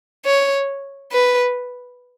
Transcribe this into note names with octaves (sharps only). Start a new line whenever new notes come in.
C#5
B4